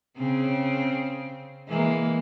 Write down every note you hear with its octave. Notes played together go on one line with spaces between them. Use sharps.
C#3 C4
E3 G#3 A#3